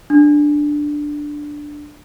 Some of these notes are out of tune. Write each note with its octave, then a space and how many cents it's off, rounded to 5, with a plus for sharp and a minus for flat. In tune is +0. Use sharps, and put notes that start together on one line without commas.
D4 +5